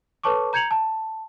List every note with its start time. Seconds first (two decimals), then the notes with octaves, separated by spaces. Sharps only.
0.23 A4 B4 C#5 A5 C#6 D6
0.53 A#5 G6 G#6 C#7 F7 F#7
0.71 A5